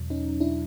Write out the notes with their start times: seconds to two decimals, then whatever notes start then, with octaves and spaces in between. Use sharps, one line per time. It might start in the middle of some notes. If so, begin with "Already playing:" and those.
Already playing: E2 B2 F#3
0.10 C#4 D#4
0.40 D4 E4